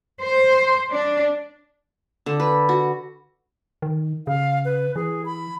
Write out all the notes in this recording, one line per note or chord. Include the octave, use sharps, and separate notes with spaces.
C5
D4
D3
B4
F#4
D#3
C#3 F5
B4
E3 G#4
B5